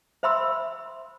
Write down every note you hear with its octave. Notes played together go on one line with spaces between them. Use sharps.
C5 E5 B5 C6 E6